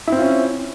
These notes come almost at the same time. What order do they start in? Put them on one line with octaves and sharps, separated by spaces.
E4 C4 F4 C#4